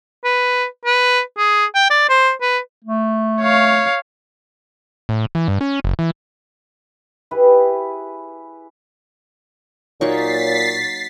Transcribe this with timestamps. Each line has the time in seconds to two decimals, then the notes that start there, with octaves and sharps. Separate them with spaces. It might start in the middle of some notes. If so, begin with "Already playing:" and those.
0.24 B4
0.86 B4
1.38 G#4
1.75 G5
1.90 D5
2.09 C5
2.41 B4
2.84 A3
3.41 C#5 F5
5.09 A2
5.35 E3
5.48 G2
5.61 C#4
5.84 F#1
5.99 E3
7.31 E4 G4 G#4 B4
10.01 A#2 F#3 A#3 D#4 C#5 A6 B6 C7